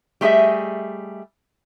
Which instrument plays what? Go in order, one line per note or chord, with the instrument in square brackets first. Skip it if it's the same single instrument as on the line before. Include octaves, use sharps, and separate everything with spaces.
[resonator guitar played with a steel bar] G3 A3 G#4 D#5 E5